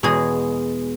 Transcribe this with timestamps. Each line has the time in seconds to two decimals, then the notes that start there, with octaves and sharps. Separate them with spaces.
0.03 E2 B2 G#3 G#4